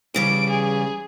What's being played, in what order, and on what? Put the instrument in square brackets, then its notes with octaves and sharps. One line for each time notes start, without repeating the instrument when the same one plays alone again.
[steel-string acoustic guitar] E2 C#3 G3 [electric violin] D7
[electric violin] G#4